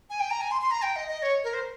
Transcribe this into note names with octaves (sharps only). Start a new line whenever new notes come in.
G#5
G5
A#5
G#5
C6
C6
A#5
G5
D#5
D#5
C#5
A#4
C5